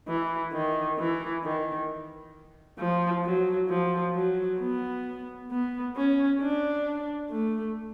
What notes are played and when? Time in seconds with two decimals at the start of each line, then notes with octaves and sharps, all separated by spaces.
0.08 E3
0.53 D#3
0.99 E3
1.44 D#3
2.79 F3
3.24 F#3
3.69 F3
4.15 F#3
4.60 B3
5.51 B3
5.96 C#4
6.41 D4
7.31 A3